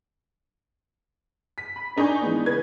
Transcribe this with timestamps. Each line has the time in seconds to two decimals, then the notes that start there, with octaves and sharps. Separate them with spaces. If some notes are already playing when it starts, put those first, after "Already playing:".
1.58 B6
1.76 B5
1.96 D4 D#4 G#5 C#6 G6
2.21 E3 G#3 B3
2.46 C#3 B4 G#6